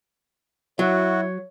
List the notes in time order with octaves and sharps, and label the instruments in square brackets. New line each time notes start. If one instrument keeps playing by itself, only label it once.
[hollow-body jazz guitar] F#3 [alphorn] E4 [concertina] F#4 [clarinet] C#5